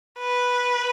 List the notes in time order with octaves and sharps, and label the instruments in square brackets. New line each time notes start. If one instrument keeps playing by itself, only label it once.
[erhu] B4